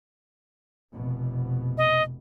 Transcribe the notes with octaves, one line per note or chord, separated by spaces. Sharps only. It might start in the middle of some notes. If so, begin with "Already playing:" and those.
F1 B2
D#5